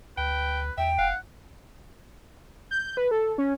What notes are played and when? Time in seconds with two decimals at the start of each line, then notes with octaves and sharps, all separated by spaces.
0.17 D2 B4 G5
0.78 E2 E5 G5
0.98 F1 F5 F#5
2.71 G6
2.97 B4
3.11 A4
3.38 C#4